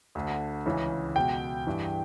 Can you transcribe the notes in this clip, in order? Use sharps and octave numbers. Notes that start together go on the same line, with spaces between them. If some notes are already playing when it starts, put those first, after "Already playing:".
D2 D3
C#2 C#3 E3
C#2 B2 G5
G2 E3